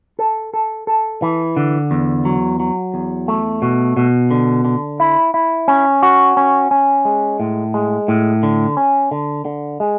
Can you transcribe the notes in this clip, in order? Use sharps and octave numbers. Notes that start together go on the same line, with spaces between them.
A4
A4
A4
E3
D3
E2
F#3
F#3
E2
A3
B2
B2
D3
D3
E4
E4
C#4
F#4
C#4
C#4
G#3
A2
G#3
A2
D3
C#4
D3
D3
G#3